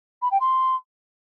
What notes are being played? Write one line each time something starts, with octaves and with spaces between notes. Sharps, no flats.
B5
G5
C6